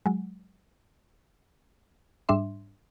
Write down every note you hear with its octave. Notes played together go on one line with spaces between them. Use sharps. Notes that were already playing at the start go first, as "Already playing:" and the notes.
F#3 G#3
G#2 G3 D4 E5 C6